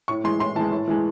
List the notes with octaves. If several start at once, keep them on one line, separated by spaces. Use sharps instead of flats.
A2 C#6
E3 G#3 C6
A2 C6
E3 G#3 A5
A2
E3 G#3